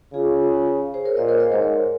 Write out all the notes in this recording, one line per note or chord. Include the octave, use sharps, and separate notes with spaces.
C#3 F4 G#4
G#4 C5
A#4 C#5
A#2 C5 D#5
A#4 C#5
C5 D#5
G#2 A#4 C#5